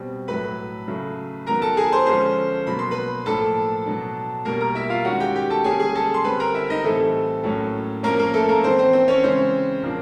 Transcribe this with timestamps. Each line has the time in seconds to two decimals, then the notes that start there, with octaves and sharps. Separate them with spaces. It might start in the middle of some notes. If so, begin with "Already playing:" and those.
Already playing: B2 G3 C4
0.28 A2 F#3 A3 B4 B5
0.88 C#3 F#3 A3
1.46 D#3 F#3 B3 A#4 A#5
1.61 A4 A5
1.77 G#4 G#5
1.92 C5 C6
2.06 D3 F3 G#3 C#4 C5 C6
2.66 B2 F#3 A#3 B5
2.79 C6
2.91 B4 B5
3.26 A2 F3 A#3 D4 A4 A5
3.86 B2 F#3 B3 D4
4.45 B2 G3 A#3 A#4 A#5
4.61 A#4 A#5
4.75 E4 E5
4.90 F4 F5
5.05 D#3 G#3 C#4 F#4 F#5
5.20 G4 G5
5.35 G4 G5
5.50 A4 A5
5.64 D3 G3 A#3 C#4 G#4 G#5
5.80 G#4 G#5
5.95 A4 A5
6.14 C6
6.24 D3 G3 C4 B4 B5
6.40 A#4 A#5
6.54 E4 E5
6.70 D#4 D#5
6.84 A2 E3 G3 A3 C4 A4
7.43 A2 F#3 A#3 C#4
8.03 F3 A#3 C#4 A#4
8.19 A#3 A#4
8.34 A3 A4
8.49 A#3 A#4
8.63 E3 A3 C4 C5
8.78 C4 C5
8.93 C4 C5
9.08 C#4 C#5
9.23 C#3 E3 G#3 C4 C#4 C5
9.82 A#2 F3 A#3 D4